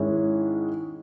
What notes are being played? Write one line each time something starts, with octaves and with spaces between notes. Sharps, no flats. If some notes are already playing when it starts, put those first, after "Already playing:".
Already playing: G#2 D#3 G#3 C#4 E4